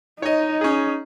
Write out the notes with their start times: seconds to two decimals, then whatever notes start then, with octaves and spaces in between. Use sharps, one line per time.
0.22 D#4 C#5 D#5
0.61 C#4 G#4